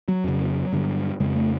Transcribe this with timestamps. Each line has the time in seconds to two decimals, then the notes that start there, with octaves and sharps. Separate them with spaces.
0.08 F#3
0.24 F2 C#3
0.73 G2 D3
1.20 F2 C#3 G#3
1.36 A3